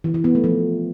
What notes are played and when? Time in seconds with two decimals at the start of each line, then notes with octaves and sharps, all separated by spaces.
0.04 E3
0.14 E3
0.24 B3
0.35 A3
0.44 F3